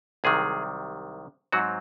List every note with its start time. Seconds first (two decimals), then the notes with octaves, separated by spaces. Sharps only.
0.24 C2 C3 D#3 F#3 G#4
1.52 G#2 F#3 C4 F#4